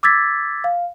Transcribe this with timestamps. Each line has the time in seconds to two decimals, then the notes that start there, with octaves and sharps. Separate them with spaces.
0.03 D6 E6 G#6 A6 B6
0.64 F5